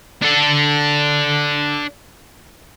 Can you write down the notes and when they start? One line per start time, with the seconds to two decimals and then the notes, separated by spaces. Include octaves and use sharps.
0.22 D4 A4